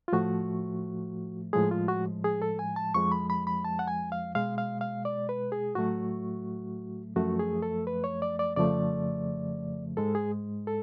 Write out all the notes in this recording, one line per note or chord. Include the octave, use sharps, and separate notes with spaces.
F4
A2 F3 A3 F#4
A2 F3 G#3 G#4
F4
F#4
G#4
A4
G#5
A5
F2 F3 G#3 C#6
B5
B5
B5
A5
F#5
G#5
F5
B2 G#3 F5
F5
F5
D5
B4
G#4
A2 F#3 A3 F#4
F#2 F3 A3 F#4
G#4
A4
B4
C#5
D5
D5
F2 C#3 F3 A3 D5
G#2 G#3 A4
G#4
A4